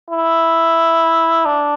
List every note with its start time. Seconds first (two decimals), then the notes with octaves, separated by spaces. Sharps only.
0.11 E4
1.46 D4